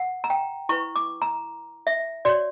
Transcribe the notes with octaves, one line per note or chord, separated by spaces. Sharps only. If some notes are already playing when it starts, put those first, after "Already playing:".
Already playing: F#5
A#5
G5
E4 B4 C#6
D6
A#5
E5
F#4 C#5 D5